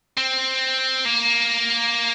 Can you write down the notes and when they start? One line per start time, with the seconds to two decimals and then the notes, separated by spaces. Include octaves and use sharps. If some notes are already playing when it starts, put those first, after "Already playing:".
0.18 C4
1.06 A#3